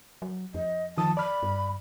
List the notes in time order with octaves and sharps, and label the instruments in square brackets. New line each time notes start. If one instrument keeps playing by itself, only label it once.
[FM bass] F#3
[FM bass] F2 [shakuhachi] D#5
[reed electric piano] D#3 F3 D#6 [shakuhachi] A5
[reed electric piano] D5 F6 [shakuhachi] B5
[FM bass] G2